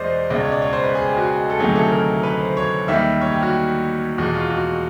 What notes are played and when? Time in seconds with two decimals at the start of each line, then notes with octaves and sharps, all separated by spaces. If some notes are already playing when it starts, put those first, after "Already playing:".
Already playing: E2 B2 G#3 C5 D5 D#5
0.30 C#2 B2 G#3 D5
0.40 C#5
0.52 D5
0.62 C#5
0.73 C5
0.84 B4
0.95 G#4
1.05 G4
1.17 F#4
1.50 A4
1.59 D2 C3 D#3 F#3 A3 G#4
1.76 A4
1.92 A#4
2.23 B4
2.40 C5
2.57 C#5
2.88 D#2 D#3 G3 A#3 E5
3.22 C#5
3.31 G4
3.43 F#4
4.18 E2 B2 G#3 F#4
4.35 F4
4.50 F#4